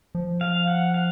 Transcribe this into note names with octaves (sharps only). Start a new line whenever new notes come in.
F3
F5
F#5
F5